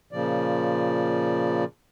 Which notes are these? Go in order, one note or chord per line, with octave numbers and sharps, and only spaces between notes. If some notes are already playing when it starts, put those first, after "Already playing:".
A#2 C#3 F3 D5